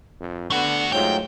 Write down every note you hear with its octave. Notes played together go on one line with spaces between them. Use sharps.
F2
D3 A3 B3 D4 F#5
G#2 F#3 A3 F4 G5